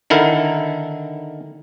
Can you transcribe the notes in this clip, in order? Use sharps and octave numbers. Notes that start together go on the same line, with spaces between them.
D3 D#3 E4 A#4